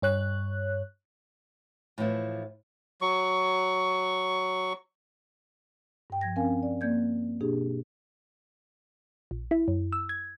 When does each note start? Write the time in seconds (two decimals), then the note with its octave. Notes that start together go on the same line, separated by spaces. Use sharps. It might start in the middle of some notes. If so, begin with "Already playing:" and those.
0.02 G2 C#5 F#6
1.98 A2 E3 F3 E4
3.01 F#3 C#6
6.10 G2 G5
6.21 F3 G#6 A#6
6.36 C4 C#4 A#4 F5 G#5
6.63 D5
6.81 A#3 D5 G6 G#6
7.41 B2 D4 G4 G#4
9.31 A#1
9.51 E4
9.68 F#2
9.92 E6
10.09 G#6